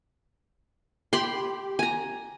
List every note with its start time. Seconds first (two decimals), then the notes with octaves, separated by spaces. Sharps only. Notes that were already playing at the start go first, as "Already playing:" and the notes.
1.13 G4 B5 C6
1.79 G#5 A#5